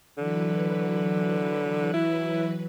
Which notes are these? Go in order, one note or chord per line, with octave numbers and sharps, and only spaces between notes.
D3 E3 F#3 B4
E4